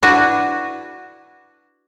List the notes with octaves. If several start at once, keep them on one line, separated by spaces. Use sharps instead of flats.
D4 E4 F#4 B4